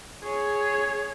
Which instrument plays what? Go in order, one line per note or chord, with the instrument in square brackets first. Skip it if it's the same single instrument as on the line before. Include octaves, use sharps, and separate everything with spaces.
[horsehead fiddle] G#4 C#5